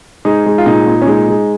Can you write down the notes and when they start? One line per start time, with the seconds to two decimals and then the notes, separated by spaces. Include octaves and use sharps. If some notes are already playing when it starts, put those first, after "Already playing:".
0.25 G#3 D#4
0.46 G#3
0.58 F4
0.66 A#2 D#4
0.87 A#2
1.01 C#4
1.06 G#3 D#4
1.28 G#3